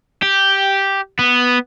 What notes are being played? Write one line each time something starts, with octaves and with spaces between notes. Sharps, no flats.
G4
B3